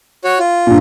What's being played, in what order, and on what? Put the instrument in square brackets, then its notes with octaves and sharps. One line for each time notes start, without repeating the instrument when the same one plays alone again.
[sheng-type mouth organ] F#4 C#5
F4
[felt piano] G2 A#2